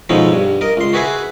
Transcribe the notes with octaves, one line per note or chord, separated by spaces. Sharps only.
B2 F3 G#3 C#4 D#4 A4
G2
A#4 D#5
C#2 C6
F#4 G#4 B4 E5 F#5 G#5